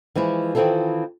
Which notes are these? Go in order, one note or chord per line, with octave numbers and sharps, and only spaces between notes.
E3 F3 G#3 E4
D#3 E3 C4 E4 F4 A4